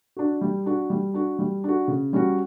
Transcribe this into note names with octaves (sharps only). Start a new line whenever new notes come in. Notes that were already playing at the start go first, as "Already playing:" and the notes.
D4 F#4
G3
D4 F#4
G3
D4 F#4
G3
D4 F#4
C#3
G3 C#4 F#4